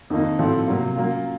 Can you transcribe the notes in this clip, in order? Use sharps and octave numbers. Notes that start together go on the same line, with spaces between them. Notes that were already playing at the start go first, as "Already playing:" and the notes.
F2 D#3 A#3 D#4
A2 F3 C4 F#4 A4
C3 F#3 A#3
F#3 A#3 C#4 F4